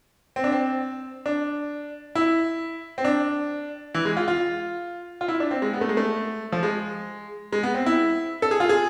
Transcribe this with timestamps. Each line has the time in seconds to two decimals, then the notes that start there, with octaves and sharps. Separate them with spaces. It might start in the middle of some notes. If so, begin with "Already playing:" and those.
0.36 C4
0.44 D4
0.52 C4
1.26 D4
2.15 E4
2.98 C4
3.05 D4
3.95 E3
4.05 G#3
4.17 F4
4.28 F4
5.21 F4
5.28 E4
5.40 D4
5.51 C4
5.62 G#3
5.73 B3
5.81 A3
5.89 G#3
5.97 A3
6.52 F3
6.63 G#3
7.52 G#3
7.63 B3
7.74 C4
7.86 E4
8.42 A4
8.51 G#4
8.60 F4
8.69 G#4